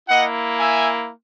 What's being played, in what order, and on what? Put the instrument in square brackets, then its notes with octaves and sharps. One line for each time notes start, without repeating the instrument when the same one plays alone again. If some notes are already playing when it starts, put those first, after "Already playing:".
[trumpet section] A#3 E4 D#5 F#5
E5 G#5